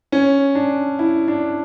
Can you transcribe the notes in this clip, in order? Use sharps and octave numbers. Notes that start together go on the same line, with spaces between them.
C#4
D4
E4
D4